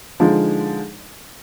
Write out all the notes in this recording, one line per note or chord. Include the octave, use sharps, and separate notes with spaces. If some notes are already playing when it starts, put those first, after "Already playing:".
D3 F3 G#3 D#4